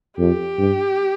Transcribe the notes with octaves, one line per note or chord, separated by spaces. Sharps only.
F2 G4
G2